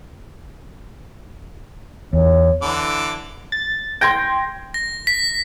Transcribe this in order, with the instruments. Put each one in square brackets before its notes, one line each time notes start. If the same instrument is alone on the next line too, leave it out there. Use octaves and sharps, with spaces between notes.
[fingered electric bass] E2 [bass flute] C#5
[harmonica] D3 E3 D6
[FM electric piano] A6
[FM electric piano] G5 [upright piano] C6 G#6 A#6
[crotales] A#6
B6